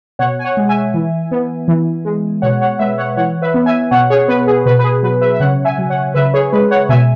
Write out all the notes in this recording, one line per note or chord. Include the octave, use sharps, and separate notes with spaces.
B2 C#5 F#5
G#5
C#5 F#5
G#3
E5 G#5
E3
B3
E3
G#3
B2 C#5 F#5
C#5 F#5
G#3 B4 E5
C#5 F#5
E3 C#5 F#5
B4 E5
B3
E5 G#5
B2 C#5 F#5
G#4 C#5
B3 B4
G#4
B2 B4
B4
G#4
F#3 B4
B4 E5
E5
C#3 C#5 F#5
E5 G#5
F#3
C#5 F#5
C#3 B4 E5
G#4 C#5
G#3 B4
C#5 F#5
B2 E5 G#5